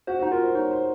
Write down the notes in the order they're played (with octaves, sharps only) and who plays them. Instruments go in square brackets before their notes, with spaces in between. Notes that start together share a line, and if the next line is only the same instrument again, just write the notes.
[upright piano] F#4 [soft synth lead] C5
[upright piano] F#4
[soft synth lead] D#4
[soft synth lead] F4 [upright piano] A#4
[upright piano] C5
[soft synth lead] D#4 [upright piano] C#5
[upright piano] C5